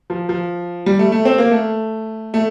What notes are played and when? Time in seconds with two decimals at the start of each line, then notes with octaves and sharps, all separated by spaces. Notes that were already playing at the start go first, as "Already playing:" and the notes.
0.10 F3
0.29 F3
0.86 G3
0.99 A3
1.12 A3
1.25 C4
1.38 A#3
1.51 A3
2.34 A3